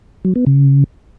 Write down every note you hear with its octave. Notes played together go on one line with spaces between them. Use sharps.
F#3
B3
C#3